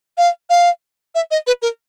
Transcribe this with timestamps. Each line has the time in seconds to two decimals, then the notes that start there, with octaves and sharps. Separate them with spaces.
0.18 F5
0.50 F5
1.15 E5
1.31 D#5
1.47 B4
1.62 A#4